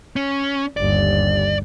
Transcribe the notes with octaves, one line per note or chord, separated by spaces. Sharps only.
C#4
G1 D#2 D5